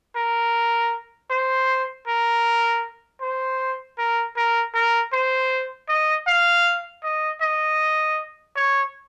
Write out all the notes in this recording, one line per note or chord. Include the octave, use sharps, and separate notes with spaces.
A#4
C5
A#4
C5
A#4
A#4
A#4
C5
D#5
F5
D#5
D#5
C#5